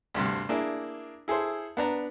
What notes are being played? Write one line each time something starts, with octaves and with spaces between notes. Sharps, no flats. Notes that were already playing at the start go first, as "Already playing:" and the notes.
D2 G2 C3
A#3 D4 E4 G#4
E4 G#4 A4 C5
B3 D4 A#5